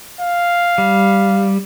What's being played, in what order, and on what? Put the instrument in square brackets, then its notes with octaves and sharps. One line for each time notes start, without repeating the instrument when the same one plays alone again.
[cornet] F5
[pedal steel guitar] G3